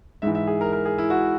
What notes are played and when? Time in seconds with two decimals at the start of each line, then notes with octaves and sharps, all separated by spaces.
0.22 G#2 E3 E5
0.35 E5
0.47 G#4
0.61 A#4
0.73 A#4
0.86 G#4
0.98 E4
1.10 F#4